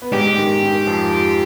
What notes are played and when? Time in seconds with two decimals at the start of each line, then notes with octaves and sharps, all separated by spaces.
0.02 B3
0.12 G#2 G#3 G4
0.38 D#3
0.63 D#3
0.87 F2 F3